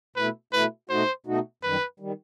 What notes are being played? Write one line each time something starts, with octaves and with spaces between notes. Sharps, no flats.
B2 A3 E4 B4
B2 A3 E4 B4
B2 A3 D#4 F#4 C5
B2 A3 D#4 F#4
F#2 D#3 G3 B4
D#3 G3